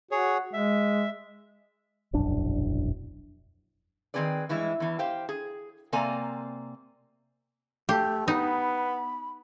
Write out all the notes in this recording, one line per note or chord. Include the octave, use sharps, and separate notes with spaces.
F#4 G#4 C#5
G#3 E5
E1 A#1 F#2 D4
D#3 F3 C4 G#4 B4 D5
G2 E3 G#3 E4
E2 E3
G4 C5 F5 G5
G#4
C3 A#3 C4 D5 G#5 A#5
A3 G4
B3 D#4 B5